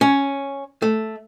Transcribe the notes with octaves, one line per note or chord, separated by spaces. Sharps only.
C#4
A3